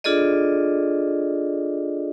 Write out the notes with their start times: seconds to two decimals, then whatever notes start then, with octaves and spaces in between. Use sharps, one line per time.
0.04 D4 F4 G#4 A4 D5 D#5